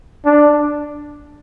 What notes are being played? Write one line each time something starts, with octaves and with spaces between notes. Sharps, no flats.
D4